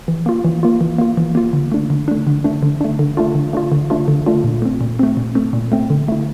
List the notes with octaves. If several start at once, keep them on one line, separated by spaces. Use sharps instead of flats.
E3
A#3 F4
E3
A#3 F4
E3
A#3 F4
E3
A#3 F4
D3
A3 D4
D3
A3 D4
D3
A3 D4
D3
A3 D4
D3
A3 D4 F4
D3
A3 D4 F4
D3
A3 D4 F4
D3
A3 D4 F4
A#2
A3 C4
A#2
A3 C4
A#2
A3 C4
A#2
A3 C4
D3
A3 E4